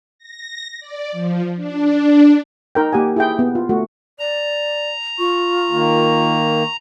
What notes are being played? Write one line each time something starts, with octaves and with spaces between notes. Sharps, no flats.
A#6
D5
F3
D4
D#4 A#4 G5
A#3 G4 F#5 G#5
E4 G#4 G5
B3
F4
A3 F#4
D5 A#5
F4 C#6
D#3 A#3